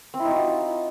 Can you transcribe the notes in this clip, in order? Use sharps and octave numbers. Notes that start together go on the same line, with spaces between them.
C4
E4
D#4
F#4
F4